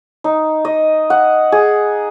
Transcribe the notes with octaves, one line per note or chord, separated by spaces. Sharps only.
D#4
D#5
F#5
G#4